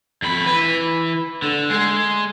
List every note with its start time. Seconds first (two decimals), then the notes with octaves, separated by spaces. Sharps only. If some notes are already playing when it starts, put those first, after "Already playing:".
0.22 F2 B5
0.46 E3 B4
1.42 D3
1.70 G#3 G#4